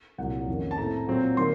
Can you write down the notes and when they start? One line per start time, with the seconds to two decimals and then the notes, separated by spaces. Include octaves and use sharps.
0.18 C2 A#2 F#3 F#5
0.47 F2 D#3 A#3 C#4
0.71 A5
0.78 A2 A3 C4 A#5
1.07 A#2 F#3 C4
1.37 D#3 F#3 A#3 C6